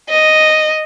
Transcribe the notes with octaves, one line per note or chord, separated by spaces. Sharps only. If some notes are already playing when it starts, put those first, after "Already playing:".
D#5